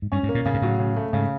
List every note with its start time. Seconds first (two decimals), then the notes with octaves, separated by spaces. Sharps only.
0.02 G#2
0.12 G2 C#4
0.23 G#2
0.29 A#3
0.35 A#2
0.46 A2 C#3
0.54 G#2
0.62 A2 F#3
0.79 C#3
0.96 A3
1.13 G#2 C#3